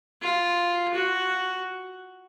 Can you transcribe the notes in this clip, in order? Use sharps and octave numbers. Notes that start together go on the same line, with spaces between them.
F4
F#4